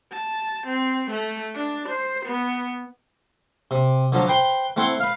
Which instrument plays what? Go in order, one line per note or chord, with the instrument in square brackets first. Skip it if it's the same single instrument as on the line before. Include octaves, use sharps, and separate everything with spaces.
[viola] A5
C4
A3
D4
C5
B3
[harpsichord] C3
D3 F3 F#3
B4 C5 G5 C6
A3 C4 E4 F#5 C6
B4 F5